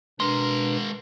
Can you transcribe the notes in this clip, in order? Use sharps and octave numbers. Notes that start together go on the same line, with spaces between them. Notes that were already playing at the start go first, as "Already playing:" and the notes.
B2 G#3 D4 A#4 B4 C6